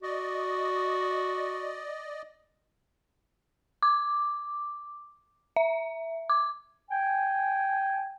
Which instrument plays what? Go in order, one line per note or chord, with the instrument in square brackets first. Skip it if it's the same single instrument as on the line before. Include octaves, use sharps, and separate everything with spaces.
[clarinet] F#4 [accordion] D5 D#5
[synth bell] D6
E5
D6
[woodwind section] G5 G#5